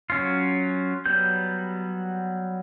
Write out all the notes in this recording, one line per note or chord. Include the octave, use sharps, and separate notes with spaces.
F#3 C#4 F4
F#3 G3 B3 G6